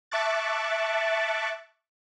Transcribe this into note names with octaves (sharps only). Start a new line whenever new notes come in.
E5 A5 C#6 D6 F#6 A6